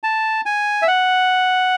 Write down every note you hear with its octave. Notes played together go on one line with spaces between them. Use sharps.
A5
G#5
E5
F#5